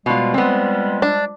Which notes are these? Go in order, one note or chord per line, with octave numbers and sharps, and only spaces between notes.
B2 F3 G3 G#3 F4
B3 C4
D4